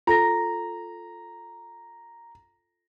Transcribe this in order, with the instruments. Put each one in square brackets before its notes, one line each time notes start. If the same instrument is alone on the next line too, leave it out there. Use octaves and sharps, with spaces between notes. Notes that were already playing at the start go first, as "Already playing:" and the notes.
[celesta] F4 A4 A#6 [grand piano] A#5